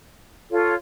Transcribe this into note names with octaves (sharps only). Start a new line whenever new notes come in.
F4 A4 C#5